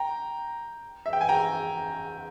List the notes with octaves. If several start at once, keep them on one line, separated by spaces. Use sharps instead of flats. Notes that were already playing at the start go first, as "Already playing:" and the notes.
Already playing: G5 A#5
E5
G5
G#5
G5 A#5